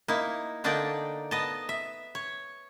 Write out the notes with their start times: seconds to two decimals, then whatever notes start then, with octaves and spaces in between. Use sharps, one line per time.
0.08 A#3 D#4 E4
0.64 D3 A#3 D4 D#4 D5 G5
1.31 B3 D#5 A5
1.69 E5
2.15 C#5